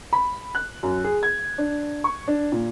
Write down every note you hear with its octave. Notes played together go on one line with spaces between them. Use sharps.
B5
F#6
F#2
G#4
G#6
D4
C#6
D4
A#2